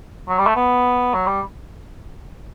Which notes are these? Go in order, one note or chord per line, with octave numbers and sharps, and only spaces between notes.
F#3
G3
A3
B3
F#3
G3